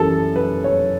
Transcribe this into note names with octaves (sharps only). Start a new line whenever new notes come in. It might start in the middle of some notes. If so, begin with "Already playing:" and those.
Already playing: F#2 E3 G3 A4
B4
C#5